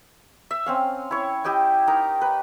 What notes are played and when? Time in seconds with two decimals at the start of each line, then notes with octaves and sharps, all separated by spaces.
0.51 E5
0.66 C4 C#4 F5
1.11 E4 C#5
1.44 E4 G4 D#5 G5
1.87 D#4 A#4 A#5
2.21 B4